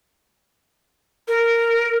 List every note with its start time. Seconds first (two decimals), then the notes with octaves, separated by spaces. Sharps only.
1.28 A#4